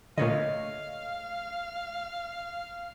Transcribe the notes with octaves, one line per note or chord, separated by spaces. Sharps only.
A#2 D3 A3 C#5 D#5 F5